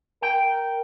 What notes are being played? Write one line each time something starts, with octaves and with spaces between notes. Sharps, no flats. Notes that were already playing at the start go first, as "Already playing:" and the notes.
A#4 G5